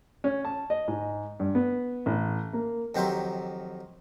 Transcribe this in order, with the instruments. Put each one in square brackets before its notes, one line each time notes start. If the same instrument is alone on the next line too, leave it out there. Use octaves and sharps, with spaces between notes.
[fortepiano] C#4
A5
D#5
G#2
G2
B3
A1
A#3
[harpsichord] F2 D#3 F#3 G4 C5 E5